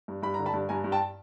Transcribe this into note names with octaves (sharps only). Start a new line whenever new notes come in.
G2
G2 B5
D3 A#5
A5 B5
G2
G2 G#5 A#5
G2
G5 A5